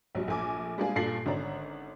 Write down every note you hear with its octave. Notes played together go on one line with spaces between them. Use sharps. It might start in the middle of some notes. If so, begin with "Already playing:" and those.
A#1 F#3 G3
A#1 A3 G#5 D6
G3 G#3 A#3 D4 G#4
G2 A#2 A4 A#6 C7 F#7
G#1 D3 C#4 D4 A#5